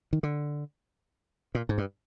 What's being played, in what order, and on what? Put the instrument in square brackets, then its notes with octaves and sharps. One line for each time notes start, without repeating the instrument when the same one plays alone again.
[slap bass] D#3
D3
A#2
G#2
G2